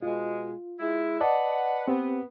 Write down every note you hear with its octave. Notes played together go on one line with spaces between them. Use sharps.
B2 G#3 F4
G#3 E4
B4 D5 D#5 F#5 A5
B3 C4 G4